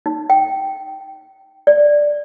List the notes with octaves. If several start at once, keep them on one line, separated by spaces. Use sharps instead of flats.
D#4
G5
D5